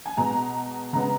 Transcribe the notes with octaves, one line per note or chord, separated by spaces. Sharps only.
G#5
B2 G#3 B3 A#5
C#3 G#3 B3 A#5